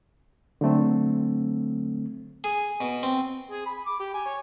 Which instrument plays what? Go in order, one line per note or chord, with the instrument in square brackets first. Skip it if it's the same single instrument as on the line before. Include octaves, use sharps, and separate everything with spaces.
[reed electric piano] D3 F#3 A3 C4
[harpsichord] G#4
B2
C4
[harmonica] G#4
B5
D6
G4
G#5
C#5